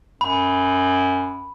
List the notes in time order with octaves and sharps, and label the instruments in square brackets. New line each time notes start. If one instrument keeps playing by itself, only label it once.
[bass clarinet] F#2 [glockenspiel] B5